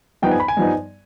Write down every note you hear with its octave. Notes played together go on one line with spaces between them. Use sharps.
G2 F3 B3 D#4 G5
G#5
B5
G#5
G2 F3 B3 D#4